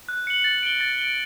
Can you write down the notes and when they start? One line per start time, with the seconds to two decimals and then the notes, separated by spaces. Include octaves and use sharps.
0.09 F#6
0.27 C#7 F#7
0.44 A6
0.63 D7 G7
0.81 A6
0.98 D7 G7